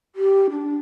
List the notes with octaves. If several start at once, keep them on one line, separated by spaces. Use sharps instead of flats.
G4
D4